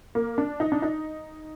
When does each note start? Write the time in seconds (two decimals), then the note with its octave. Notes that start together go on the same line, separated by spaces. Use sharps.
0.15 A#3
0.38 D4
0.60 D#4
0.72 D4
0.82 D#4